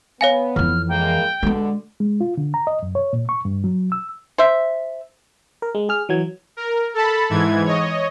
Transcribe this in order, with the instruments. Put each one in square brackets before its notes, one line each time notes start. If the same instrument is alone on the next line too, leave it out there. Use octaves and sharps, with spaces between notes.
[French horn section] B3 [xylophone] C#5 F5 G#5
[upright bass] F2 E3 [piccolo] F6
[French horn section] A2 G#3 A#3 [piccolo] G5
[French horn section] B2 D3 [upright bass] G3 G#3
[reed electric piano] G#3
F4
D3
A#5
D#5
F#2
C#5
A#2
C#6
G2
F#3
E6
[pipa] C5 E5
[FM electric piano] A#4
G#3
G#4 F6
E3 F#3 G#6
[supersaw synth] A#4
A4 A5 B5
G#2 E3 G#6
C#5 D#5